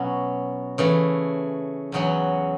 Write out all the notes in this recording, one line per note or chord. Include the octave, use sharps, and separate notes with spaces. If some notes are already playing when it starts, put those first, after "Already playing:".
Already playing: B2 F#3 C#4
C#3 E3 A3
E2 C#3 F#3 C#4